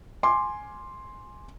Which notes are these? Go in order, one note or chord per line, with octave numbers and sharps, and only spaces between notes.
G#5 C6 D6